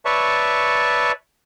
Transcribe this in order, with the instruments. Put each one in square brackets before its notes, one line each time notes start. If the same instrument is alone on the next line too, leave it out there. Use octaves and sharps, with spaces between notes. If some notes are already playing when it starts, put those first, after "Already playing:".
[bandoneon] B4 C#5 D5 E5 A5 C#6